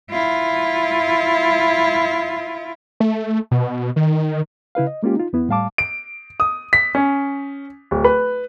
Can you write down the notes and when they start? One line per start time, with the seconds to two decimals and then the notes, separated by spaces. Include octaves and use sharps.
0.11 E4 F4
3.00 A3
3.51 B2
3.96 D#3
4.75 C#3 E4 B4 F5
4.87 D#5
5.03 G#3 A#3 C#4 F4 G4
5.16 D#4 F4
5.33 E2 B3 E4
5.49 A2 G3 F5 A5 D6
5.78 D7
6.40 D#6
6.73 B6
6.95 C#4
7.91 D1
8.04 B4